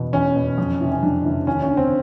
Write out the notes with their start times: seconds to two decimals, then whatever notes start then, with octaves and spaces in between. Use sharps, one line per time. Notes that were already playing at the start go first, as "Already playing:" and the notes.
Already playing: E2 B2
0.13 E2 C#4
0.36 B2
0.58 F2
0.80 C3 E3
0.92 C#4
1.03 F2 D4
1.25 C3 E3
1.47 D#2 C#4
1.62 C#4
1.70 D3
1.77 C4